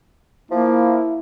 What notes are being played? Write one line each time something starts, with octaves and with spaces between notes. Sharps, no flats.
F3 A#3 E4